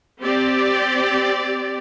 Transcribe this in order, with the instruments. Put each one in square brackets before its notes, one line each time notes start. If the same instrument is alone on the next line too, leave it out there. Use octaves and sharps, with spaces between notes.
[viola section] C4 G4 D5